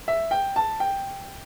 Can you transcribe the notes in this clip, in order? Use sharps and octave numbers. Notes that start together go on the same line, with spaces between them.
E5
G5
A5
G5